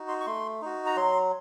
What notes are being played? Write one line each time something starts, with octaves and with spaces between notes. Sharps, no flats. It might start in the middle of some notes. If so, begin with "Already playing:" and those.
Already playing: D#4 F#4
C6
C#6
A3 C6
D#4 F#4
A#5
F#3 C6